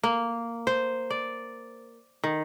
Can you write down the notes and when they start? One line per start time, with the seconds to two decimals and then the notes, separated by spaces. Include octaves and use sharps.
0.03 A#3
0.67 C5
1.10 D5
2.24 D#3